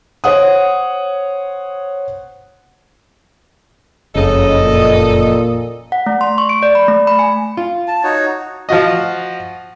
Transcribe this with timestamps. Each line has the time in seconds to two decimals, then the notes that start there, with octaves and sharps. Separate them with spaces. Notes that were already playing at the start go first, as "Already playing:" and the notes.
0.24 C5 C#5 F#5 D#6
4.16 F#1 F2 C#3 A4 D#5
4.61 A#2
5.92 F#5
6.06 A3
6.21 C6
6.38 C#6
6.49 D7
6.63 D5
6.75 B5
6.88 A3
7.07 B5
7.19 G#5
7.57 F4
7.88 A5
8.04 D#4 F#4 C#5
8.69 F3 F4 F#4 D#5